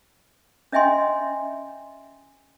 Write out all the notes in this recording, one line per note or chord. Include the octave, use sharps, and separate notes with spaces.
C#4 D#5 E5 G5 G#5 C6